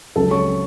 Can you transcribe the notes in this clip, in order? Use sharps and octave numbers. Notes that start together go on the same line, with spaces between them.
C#2 C#3 F#3 A4 A5
C#5 C#6
C#3 F#3